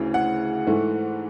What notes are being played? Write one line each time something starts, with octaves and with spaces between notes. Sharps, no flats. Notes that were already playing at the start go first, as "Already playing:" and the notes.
Already playing: D2 C#3 E3
F#5
G#2 E3 A3